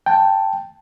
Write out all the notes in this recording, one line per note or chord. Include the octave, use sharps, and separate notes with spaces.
G5 A5